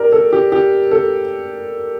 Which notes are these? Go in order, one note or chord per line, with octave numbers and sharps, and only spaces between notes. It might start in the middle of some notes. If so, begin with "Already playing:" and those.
Already playing: G4 A#4 D5
A4
G4
G4
A4